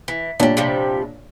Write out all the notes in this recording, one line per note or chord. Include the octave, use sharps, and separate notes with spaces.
E3
A#2 E3 G3 D4 C#5
C3 F3 G3